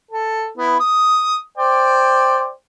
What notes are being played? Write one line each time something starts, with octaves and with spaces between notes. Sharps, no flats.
A4
B3 E4
D#6
C5 D5 G5